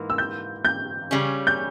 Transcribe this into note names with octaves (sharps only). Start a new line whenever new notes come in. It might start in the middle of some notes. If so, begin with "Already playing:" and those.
Already playing: G#2 E3 A#3
E6
G6
G6
C#3 G3 C#4
G6